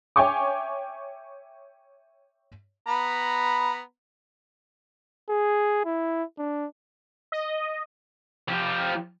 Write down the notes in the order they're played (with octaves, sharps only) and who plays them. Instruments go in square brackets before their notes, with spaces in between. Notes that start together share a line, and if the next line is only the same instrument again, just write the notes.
[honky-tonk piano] C#5 E5 G5 G#5 C#6 D6
[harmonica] B3 A#5 B5
[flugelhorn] G#4
E4
D4
[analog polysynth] D#5
[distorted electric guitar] F3 G4